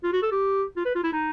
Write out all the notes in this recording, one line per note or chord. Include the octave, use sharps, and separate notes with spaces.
F4
F#4
A4
G4
F4
B4
F4
E4
D#4